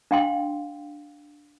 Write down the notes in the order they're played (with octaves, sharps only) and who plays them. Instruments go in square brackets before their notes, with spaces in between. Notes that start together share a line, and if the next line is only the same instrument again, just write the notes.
[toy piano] D4 F5 G5 C6